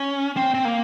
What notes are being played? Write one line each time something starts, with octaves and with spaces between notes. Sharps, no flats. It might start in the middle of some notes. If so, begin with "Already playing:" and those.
Already playing: C#4
C4
C4
A#3